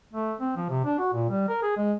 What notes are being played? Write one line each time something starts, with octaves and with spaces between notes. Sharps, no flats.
A3
C4
F3
C3
D4
F#4
A#2
G3
A#4
G#4
G#3